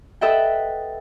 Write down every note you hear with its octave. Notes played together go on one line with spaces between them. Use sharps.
A4 B4 D#5 E5 F#5 G5